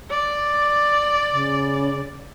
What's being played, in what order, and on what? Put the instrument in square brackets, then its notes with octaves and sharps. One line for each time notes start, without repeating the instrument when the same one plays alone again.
[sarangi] D5
[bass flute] C#3